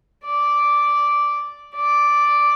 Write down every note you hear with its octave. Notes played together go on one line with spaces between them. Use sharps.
D5
D5